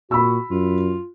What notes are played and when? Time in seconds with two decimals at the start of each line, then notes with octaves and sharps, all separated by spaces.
0.11 A#2 F#4 B5 E6
0.51 F#2 F4